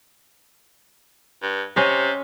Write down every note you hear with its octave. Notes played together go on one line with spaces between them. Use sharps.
G2
C3 C#4 D#5